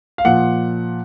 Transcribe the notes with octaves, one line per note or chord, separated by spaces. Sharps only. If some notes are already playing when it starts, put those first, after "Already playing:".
F5
A#2 F3 F#5